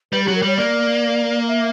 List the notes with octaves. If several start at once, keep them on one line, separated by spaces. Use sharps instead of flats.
G3 B4
F#3 G4
A#4
G3 C#5
A#3 D5
E5